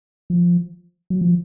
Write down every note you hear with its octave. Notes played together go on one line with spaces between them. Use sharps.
F3
F#3
F3